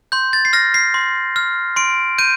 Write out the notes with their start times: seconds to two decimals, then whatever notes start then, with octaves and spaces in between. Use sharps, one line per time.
0.12 C6 G6
0.33 A6
0.45 C7
0.53 F6 A#6
0.74 C7
0.94 C6
1.36 F6
1.76 C6 D7
2.18 G6 D#7